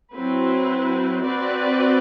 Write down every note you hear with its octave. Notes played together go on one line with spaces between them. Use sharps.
F#3 C4 E4 B4
C4 F#4 B4 D5